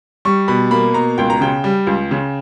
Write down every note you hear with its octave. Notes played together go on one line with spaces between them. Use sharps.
G3 C#6
B2 B5
A#3 B5
B2 A#5
C#2 G5
A#5
C#3 G5
G3
C#2
C#3